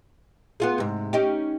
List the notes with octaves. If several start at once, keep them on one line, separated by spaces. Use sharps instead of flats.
B3 F4 G#4
G#2 C3
C#4 D#4 G4